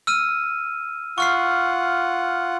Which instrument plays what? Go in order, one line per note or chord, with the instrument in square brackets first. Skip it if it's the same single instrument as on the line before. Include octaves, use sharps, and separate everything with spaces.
[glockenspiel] E6 F6 D#7
[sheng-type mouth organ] F4 F#5 [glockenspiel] C#6 F6 C7